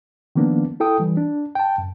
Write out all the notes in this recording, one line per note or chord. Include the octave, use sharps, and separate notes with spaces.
D#3 F3 A#3 B3 D4
E4 A4 G5 D#6
E3 G3
D4
G5 A5
F#2